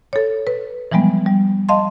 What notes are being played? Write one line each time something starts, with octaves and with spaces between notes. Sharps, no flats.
A4 C#5
B4
E3 F3 G3 G#3 B3
G3
D#5 F5 A5 C6